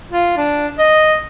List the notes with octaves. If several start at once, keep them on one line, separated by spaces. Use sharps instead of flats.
F4
D4
D#5